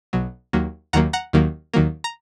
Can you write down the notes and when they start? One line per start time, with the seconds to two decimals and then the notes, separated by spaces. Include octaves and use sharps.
0.13 B1 B2 F#3
0.53 D#2 D#3 F#3 A#3
0.93 D#2 D#3 F#3 A#3 F#5 A#5
1.13 F#5 A#5
1.33 D#2 D#3 F#3 A#3
1.74 D#2 D#3 F#3 A#3
2.04 A#5